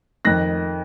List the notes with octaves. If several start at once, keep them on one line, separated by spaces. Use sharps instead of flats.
F2 D#3 F#6 A#6